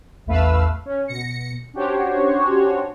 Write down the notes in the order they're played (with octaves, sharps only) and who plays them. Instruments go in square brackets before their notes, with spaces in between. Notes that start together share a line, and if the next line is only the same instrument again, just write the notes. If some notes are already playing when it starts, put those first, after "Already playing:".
[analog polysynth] A1 E2 A3 B4 F5 E6
C#4
B2 A#6 C#7
C#4 D4 F#4 G4 C5 C#5